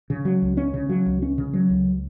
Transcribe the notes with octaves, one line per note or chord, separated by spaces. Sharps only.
C#3
F#3
C#2
C#4
C#3
F#3
C#2
C#4
C#3
F#3
C#2